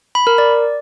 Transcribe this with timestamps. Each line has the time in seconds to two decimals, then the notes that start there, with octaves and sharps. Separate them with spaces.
0.15 B5
0.27 A#4
0.38 D5